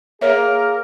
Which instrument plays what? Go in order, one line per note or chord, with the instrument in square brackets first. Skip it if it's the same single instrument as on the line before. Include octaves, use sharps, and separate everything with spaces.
[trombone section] A#3 G#4 [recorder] A#4 [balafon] C#5 E5